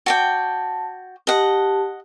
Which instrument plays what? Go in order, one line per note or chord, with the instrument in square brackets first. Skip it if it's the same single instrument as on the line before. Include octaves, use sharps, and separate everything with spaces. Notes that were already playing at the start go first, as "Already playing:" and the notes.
[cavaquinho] F#4 D5 G5 [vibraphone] A5
[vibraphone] G4 A5 [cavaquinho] D#5 F#5